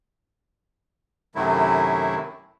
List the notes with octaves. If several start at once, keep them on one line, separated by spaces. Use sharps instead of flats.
F#2 C3 D#3 F#3 A3 E4